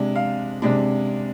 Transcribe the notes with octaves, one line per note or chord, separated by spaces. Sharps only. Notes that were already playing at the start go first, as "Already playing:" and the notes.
Already playing: C3 G#3 D4
F5
C3 G#3 D4